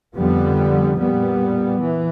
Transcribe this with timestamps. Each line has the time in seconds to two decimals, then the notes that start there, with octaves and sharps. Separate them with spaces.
0.15 F2 D3 G3 B3
0.99 A#2 G3 B3
1.81 E3